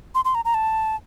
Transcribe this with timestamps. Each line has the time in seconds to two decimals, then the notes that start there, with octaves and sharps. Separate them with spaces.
0.15 C6
0.25 C6
0.35 A#5
0.45 A#5
0.54 A5